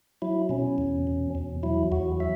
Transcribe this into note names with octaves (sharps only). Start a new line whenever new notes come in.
F#3 E4
B2 C#4
E2
B2
E2
F#3 E4
E2 F#4
F#3 E5